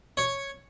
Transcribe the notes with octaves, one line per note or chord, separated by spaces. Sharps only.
C#5